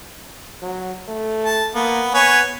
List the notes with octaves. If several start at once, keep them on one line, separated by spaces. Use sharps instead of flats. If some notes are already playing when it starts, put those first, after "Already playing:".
F#3
A3
A5
A#3 B3
B3 B4 C#5 G#5